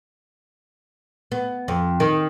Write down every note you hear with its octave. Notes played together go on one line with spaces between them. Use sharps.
B3
F2
D#3